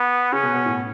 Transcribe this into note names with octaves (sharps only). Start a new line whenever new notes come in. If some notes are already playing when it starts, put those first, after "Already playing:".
Already playing: B3
C#3 C#4
B2
B2
A2